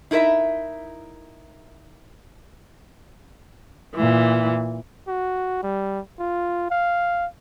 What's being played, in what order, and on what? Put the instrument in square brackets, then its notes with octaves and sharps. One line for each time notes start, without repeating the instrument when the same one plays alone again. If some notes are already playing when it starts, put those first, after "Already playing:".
[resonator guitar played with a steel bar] D#4 E4 A#4 B4 E5
[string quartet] A#2 E3
[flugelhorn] F#4
G3
F4
F5